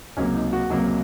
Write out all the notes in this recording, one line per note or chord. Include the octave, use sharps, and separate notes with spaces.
C#2 C3 F#3 A#3 C#4
D#4
F#4
C#2 C3 F#3 A#3